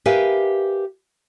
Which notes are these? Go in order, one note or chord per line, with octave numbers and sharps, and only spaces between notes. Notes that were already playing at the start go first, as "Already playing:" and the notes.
G4 A#4 B4 E5 F5 G#5